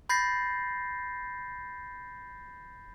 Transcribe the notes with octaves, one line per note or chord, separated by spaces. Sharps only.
B5 G6 A6 A#6 C7